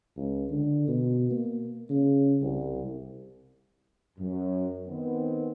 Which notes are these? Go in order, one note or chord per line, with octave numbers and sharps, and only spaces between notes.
C#2
D3
B2
A#3
C#3
C2
F#2
D#3 B3 C4